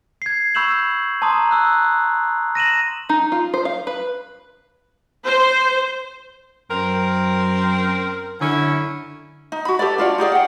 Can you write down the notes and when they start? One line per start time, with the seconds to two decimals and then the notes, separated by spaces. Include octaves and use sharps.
0.22 G#6 C7
0.55 B5 C#6 E6 G6 E7 F#7
1.22 A5 A#5 C6 D#6
1.51 E6 F#6
2.55 A#6 D#7 E7 F#7
3.09 D#4
3.32 F4
3.54 C5
3.65 F5
3.87 B4
5.24 C5
6.71 F#2 C4 A#4
8.41 F#2 D3 C#4 E4
9.52 D#4
9.65 F#4 B5
9.79 G4 A4 B4 D5
9.98 D4 F4 F#4 D5
10.18 D#4 G4 G#4 D5
10.32 F#5 G5